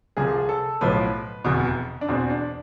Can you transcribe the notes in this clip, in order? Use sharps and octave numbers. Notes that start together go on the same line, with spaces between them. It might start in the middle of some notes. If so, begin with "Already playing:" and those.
C2 C3 F3 G#4
A4
B1 A2 F3 B4
F1 E2 B2
D4
E2 B2 C4
D4